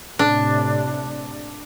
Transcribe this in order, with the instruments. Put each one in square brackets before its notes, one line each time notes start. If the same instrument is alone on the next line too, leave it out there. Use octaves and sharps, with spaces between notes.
[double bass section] A2 C3 [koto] D4